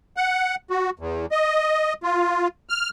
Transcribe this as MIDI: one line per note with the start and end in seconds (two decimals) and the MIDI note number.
0.17 0.55 78
0.70 0.90 66
0.99 1.26 40
1.31 1.93 75
2.03 2.48 65
2.69 2.89 89